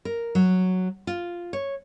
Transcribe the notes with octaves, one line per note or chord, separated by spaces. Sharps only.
A#4
F#3
F4
C#5